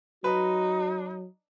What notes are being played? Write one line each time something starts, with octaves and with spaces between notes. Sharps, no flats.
F#3 D#4 F#4 B4